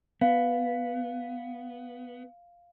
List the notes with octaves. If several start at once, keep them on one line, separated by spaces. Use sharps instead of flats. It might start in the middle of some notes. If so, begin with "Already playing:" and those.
B3 F5